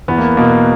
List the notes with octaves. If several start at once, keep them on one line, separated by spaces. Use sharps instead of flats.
E2 B3
A#3
B2 A#3